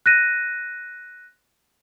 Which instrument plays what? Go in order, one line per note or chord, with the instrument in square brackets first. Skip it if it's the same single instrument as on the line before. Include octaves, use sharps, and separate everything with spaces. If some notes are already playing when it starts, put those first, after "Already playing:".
[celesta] F#6 A#6 D#7